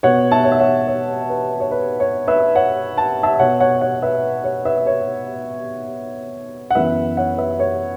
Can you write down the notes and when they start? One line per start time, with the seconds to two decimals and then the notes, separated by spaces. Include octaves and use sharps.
0.03 B2 B3 C#5 F#5
0.31 E5 A5
0.44 C#5
0.52 E5
0.60 C#5 F#5
0.88 C#5
1.30 B4
1.60 C#5
1.71 B4
2.00 C#5
2.27 B4 E5
2.55 C#5 F#5
2.98 A5
3.23 E5 A5
3.39 B2 B3 C#5 F#5
3.60 C#5 F#5
3.81 C#5 F#5
4.02 B4 E5
4.44 C#5
4.65 B4 E5
4.87 C#5
6.70 F#5
6.75 F#2 E3 B3 B4 E5
7.17 C#5 F#5
7.38 B4 E5
7.60 C#5